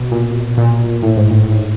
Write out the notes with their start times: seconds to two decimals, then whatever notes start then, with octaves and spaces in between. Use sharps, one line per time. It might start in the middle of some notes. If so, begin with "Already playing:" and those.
Already playing: B2
0.11 A#2
0.57 A#2
1.02 A2
1.17 G#2
1.31 A2